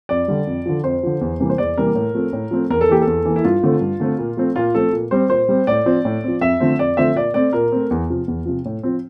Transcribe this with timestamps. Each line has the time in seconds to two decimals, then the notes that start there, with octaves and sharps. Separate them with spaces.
0.09 F2 D5
0.28 D3 G3
0.47 F2
0.66 D3 F3
0.84 F2 C5
1.03 D3 F3
1.21 E2
1.40 C3 E3 G3 A#3
1.50 C5
1.58 E2 D5
1.78 C3 E3 G3 A#3 A#4
1.95 A2
2.15 F3 A3 C4
2.33 A2
2.51 F3 A3 C4
2.70 E2 A#4
2.81 A4
2.89 E3 A#3 G4
3.02 A4
3.07 E2
3.25 E3 A#3
3.36 E4
3.44 G2 F4
3.63 D3 A3 C4
3.81 G2
4.00 D3 A3 C4
4.19 A#2
4.37 F3 A3 C4
4.56 A#2 F4
4.74 F3 A3 C4 A4
4.93 A#2
5.11 G3 C4 C5
5.30 A#2 C5
5.49 G3 C4
5.67 A2 D5
5.86 F3 C4
6.05 A2
6.24 F3 C4
6.41 F2 E5
6.60 D3 F3 A3 C4
6.79 F2 D5
6.97 D3 F3 A3 C4 E5
7.15 A#2 D5
7.34 A3 C4 D5
7.53 A#2 A#4
7.72 A3 C4
7.91 E2
8.10 C3 F3
8.28 E2
8.46 C3 F3
8.65 A2
8.83 F3 C4